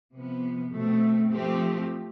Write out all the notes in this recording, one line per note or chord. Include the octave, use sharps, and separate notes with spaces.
C3 F3 B3
B2 A3 C4
F3 A3 C4 G4